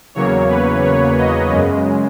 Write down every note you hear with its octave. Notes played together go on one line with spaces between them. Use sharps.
E2 C#3 F#3 A#3 C#5
B4
C#5
D#5
F#2 C#3 G#3